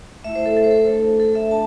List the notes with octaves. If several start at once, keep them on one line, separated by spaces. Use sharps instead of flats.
A3 E4 E5
C5
A4
A4
C5
A4
A3 D4
A4
E5
D4 A5